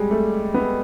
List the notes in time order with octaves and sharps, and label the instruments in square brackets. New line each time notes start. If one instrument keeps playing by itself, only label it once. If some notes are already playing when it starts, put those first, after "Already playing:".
Already playing: [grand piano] G3 G#3
A3
B3